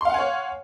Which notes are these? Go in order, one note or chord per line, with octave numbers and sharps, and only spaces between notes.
C#5 F5 F#5 G#5 C6